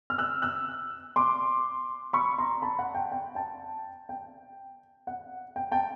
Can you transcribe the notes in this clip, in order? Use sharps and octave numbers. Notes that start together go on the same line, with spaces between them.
F6
E6 F#6
E6 F#6
C6 D6
B5 C#6
A#5 C6
A5 B5
F#5
G5
G5
G5 A5
G5
F#5
G5
G5 A5